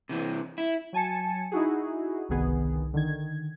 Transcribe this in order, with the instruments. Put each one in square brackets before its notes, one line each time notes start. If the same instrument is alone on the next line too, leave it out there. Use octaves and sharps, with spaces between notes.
[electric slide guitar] C3 E3 C4
E4
[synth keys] F#3 G#5 A5 C#7
D#4 E4 F#4 G#4
G1 C2 D#3 B3 G#4
D3 D#3 G#6